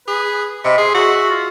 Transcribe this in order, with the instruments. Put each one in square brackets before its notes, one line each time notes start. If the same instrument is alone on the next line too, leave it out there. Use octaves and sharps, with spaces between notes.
[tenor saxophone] G#4 [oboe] B4
[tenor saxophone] C3 [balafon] D#5 [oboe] B5
[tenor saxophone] G#4 [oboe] C6
[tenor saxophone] F#4 [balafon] G#4 [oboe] E5
[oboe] F4